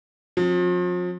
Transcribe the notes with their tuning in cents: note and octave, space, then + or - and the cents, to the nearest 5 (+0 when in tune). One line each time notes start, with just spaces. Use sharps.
F3 +40 C4 +40